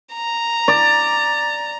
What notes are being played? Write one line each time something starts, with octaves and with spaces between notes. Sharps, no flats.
A#5
D5